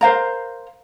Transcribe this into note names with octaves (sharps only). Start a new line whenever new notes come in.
A#4 C5 F5 A#5